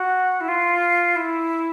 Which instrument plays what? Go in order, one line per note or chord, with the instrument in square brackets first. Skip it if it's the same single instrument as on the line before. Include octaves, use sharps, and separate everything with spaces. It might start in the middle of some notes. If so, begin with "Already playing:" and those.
Already playing: [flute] F#4
E4
F4
E4